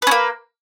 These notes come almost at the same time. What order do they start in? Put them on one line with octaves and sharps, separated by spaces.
B4 C#4 A#3